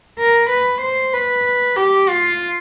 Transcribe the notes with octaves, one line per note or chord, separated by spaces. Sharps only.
A#4
B4
C5
B4
G4
F4